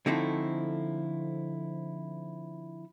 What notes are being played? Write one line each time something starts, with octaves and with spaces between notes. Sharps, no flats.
D3 F3 A3 C4 D#4 E4